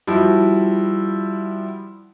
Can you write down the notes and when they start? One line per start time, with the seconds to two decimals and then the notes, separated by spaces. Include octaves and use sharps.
0.07 F3 G3 E4 F#4